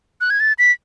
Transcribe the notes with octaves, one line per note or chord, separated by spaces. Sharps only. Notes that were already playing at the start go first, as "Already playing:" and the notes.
F#6
G#6
A6
B6